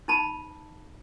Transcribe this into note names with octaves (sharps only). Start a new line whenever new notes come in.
D#4 A5 B5